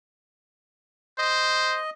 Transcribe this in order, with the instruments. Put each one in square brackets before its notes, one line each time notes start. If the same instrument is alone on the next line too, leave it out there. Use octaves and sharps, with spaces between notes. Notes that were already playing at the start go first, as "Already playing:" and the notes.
[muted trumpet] C5 [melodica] D#5